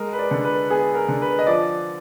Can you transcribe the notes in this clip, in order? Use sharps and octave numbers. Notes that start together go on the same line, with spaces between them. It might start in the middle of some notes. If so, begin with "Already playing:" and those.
Already playing: G#3 A#4
B4
D5
D3
B4
B3 G#4
A#4
D3
B4
D#5
F3 D5